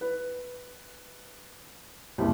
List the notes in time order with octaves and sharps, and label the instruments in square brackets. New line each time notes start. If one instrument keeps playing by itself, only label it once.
[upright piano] B4
F#1 C2